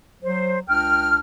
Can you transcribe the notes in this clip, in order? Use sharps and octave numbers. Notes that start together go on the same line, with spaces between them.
F#3 C5
C#2 D4 G5 F6